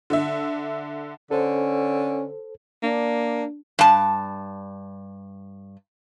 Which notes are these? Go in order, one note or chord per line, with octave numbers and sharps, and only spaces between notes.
D3 E5
D3 C#4 A4 C5
A#3 D4
G2 A5